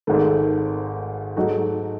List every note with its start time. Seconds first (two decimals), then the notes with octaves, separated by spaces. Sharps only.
0.07 G#1 G#2 D#3 A3
1.37 G#2 F#3 A3 D#4 F#4